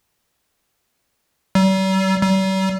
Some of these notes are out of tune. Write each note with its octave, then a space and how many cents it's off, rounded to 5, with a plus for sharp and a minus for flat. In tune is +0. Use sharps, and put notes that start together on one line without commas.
G3 -45
G3 -45